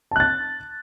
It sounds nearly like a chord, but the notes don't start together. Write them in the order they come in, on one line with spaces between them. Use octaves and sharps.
A5 F#6 A6